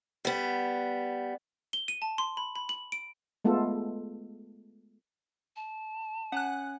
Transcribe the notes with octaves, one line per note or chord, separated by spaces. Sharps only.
G3 B3
G7
D#7
A5
C6
B5
B5
F#7
D7
G#3 A3 B3 F4 A4
A5
C#4 F#5 G#5 F#6